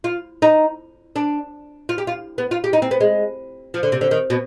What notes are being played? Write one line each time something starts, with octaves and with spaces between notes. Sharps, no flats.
F4
D#4
D4
F4
G4
F4
B3
F4
G4
D#4
C4
B3
G#3
F3
D3
C3
D3
D#3
B2